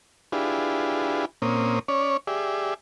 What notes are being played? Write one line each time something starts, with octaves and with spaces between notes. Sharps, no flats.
D4 E4 F4 G4 G#4 B4
A#2 A#3 C4 C#4 D#6
C#4 C#5 D5
G4 G#4 D5 E5